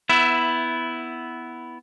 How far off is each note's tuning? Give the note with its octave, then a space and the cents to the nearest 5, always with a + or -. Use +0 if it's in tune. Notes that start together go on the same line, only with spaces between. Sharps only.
B3 +5 E4 +0 E5 +20